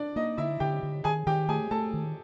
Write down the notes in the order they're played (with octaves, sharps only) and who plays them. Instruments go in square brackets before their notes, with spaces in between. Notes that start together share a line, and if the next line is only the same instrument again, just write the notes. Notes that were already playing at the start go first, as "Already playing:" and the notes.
Already playing: [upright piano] D4 D5
[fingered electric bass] A#3 [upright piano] D#4 D#5
[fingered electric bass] D3 [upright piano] E4 E5
[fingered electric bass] D3 [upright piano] G4 G5
[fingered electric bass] D3
[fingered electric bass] D#3 [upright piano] G#4 G#5
[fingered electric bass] D#3 [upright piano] G4 G5
[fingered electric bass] A3 [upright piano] G#4 G#5
[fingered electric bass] A3 [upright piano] A4 A5
[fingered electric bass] D#3